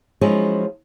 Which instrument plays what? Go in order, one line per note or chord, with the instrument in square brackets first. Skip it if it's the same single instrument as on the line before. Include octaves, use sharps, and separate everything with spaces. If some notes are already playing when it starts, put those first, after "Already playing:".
[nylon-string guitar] F3 F#3 G#3 C#4 D#4 E4